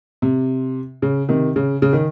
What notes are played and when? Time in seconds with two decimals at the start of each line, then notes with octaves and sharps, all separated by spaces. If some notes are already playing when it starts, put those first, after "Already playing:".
0.22 C3
1.02 C#3
1.29 C3 D#3
1.56 C#3
1.82 C#3
1.93 D#3